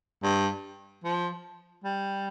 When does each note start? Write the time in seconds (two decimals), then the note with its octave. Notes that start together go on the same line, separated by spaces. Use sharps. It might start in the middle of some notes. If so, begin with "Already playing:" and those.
0.23 G2
1.04 F3
1.84 G3